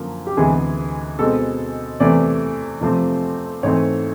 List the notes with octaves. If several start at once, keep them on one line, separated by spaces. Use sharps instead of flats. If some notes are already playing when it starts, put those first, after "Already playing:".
Already playing: F#2 D3 F3 A#3
G4
D2 C3 E3 G#3 B3 G#4
B2 G#3 C4 A4
E2 C3 E3 A3 C4 D5
F2 C3 F3 A3 C4
G#2 E3 A3 C4 C#5